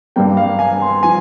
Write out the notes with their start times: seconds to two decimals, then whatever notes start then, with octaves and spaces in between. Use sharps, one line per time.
0.16 G2 G3 A#3 G5
0.37 F5
0.59 G#5
0.82 C6
1.03 F3 G#5